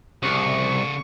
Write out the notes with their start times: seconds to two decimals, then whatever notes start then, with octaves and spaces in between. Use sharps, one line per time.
0.23 C2 C#3 D5 C#6